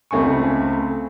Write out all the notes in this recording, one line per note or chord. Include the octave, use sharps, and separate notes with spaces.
C#2 A3 C4 G#5 C#6